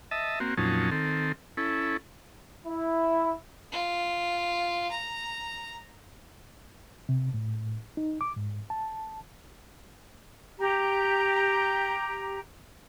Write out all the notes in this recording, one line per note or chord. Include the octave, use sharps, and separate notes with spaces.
D#5 E5 A5
A#3 C4 F#4
F2 A#2 F#3 C#4 D#4 A5
D#3 C4 A4
C#4 E4 A4
E4
F4
A#5
C3
A2
D#4
D6
G#2
A5
G4 A#5